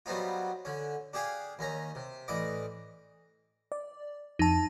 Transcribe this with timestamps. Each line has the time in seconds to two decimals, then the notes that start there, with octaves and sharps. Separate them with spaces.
0.06 F#3 G3 B3 C4 D#4 F4
0.65 D3 C#4
1.13 D4 G4 G#4 F5 G#5
1.59 D#2 C#4 A#5
1.95 C3
2.28 A1 E3 D5 D#5 D6
3.72 D5
4.39 F2 D#4 A5